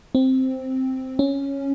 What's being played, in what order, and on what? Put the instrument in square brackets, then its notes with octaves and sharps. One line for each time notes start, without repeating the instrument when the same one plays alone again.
[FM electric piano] C4
C#4